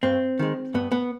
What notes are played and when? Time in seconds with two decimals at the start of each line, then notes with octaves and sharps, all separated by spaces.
0.03 G2 C4
0.39 D#3 G#3
0.74 G2 B3
0.92 B3